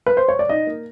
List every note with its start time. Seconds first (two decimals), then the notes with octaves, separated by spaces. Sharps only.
0.06 B4
0.17 C5
0.29 C#5
0.39 D5
0.49 D#4 D#5
0.67 A#3